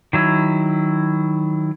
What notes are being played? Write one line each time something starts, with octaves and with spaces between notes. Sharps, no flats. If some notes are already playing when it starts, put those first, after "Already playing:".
D#3 F#3 E4